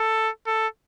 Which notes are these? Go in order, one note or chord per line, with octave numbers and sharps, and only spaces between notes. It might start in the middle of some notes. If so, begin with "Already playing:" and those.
Already playing: A4
A4